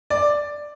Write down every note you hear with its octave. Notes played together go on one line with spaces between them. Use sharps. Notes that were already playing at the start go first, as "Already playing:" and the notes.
D5